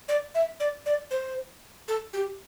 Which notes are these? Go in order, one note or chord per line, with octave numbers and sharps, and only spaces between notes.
D5
E5
D5
D5
C5
A4
G4